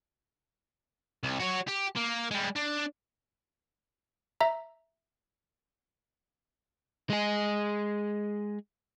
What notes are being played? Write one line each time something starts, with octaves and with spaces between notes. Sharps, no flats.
C2
F#4 C#5
G4
A#3
G3 G#3
D4
E5 A#5
G#3 G#4